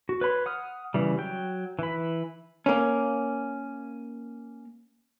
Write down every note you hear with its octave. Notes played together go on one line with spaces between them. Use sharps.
F#4
B4 C#5 B5 C6
F#5 D#6 F6
C#3 E3 G3
F#3 G5
E3 B5
A#3 C#4